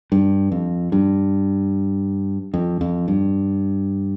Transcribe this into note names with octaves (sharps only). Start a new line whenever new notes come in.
G2
F2
G2
F2
F2
G2